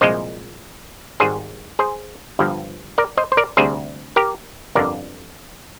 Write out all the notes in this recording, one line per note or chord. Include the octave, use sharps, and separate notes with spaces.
C2 A#2 F3 G#3 C5 D#5
G#1 G#2 G3 G#4 C5
G#4 C5
G1 G2 F3
A#4 D5
C5 D#5
C5
A#4 D5
D2 C3 G3 G#4 C5
G4 A#4
G1 F2 D3 A#4 D5